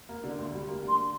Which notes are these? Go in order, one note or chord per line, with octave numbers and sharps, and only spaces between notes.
A#3
D3
D2
G3
A#3
D3
C6